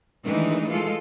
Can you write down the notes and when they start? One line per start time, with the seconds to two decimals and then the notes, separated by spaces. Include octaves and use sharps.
0.24 D#3 E3 G#3 A3 D4 D#4
0.69 G#3 F4 A4